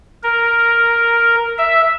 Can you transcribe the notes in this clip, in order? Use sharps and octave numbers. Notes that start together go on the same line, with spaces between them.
A#4
E5